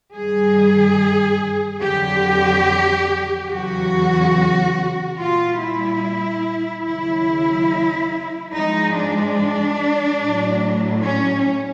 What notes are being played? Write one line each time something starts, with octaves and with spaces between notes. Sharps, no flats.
G2 D#3 G3 G#4
F2 D3 F#3 G4
E2 C#3 F#3 F#4
A#2 G3 F4
E4
D#2 C#3 F#3 E4
G#2 F3 G#3 D#4
D4
A2 F#3
C#4